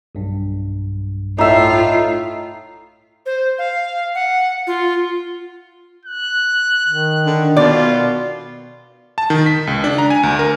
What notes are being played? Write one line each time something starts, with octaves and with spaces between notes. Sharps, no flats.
B1 G2
A2 D#4 F4 E5
C5
F5
F#5
F4
F#6
D#3
D3
B2 F4 D5
A5
D#3
B6
C#2
D4
A#5
G#5
D2
A#4